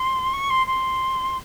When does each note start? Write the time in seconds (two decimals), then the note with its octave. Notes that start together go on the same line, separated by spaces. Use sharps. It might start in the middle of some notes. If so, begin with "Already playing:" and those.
Already playing: C6
0.33 C#6
0.50 C6
0.67 C6